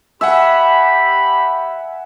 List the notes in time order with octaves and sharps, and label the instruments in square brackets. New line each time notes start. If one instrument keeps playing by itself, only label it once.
[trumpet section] G4 B5 [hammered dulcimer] E5 [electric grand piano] F#5 G#5 E6